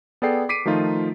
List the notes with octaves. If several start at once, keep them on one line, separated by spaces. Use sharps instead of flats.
B3 G#4 A4 D5 G5 C7
D6 B6 C7 D7 D#7
D#3 F3 A3 D#4 F4